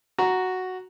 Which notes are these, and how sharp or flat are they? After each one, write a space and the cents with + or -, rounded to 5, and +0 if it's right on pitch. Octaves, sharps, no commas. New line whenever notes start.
F#4 +0 A#5 +0